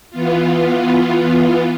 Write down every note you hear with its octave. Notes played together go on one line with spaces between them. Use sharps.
E3 B3 F4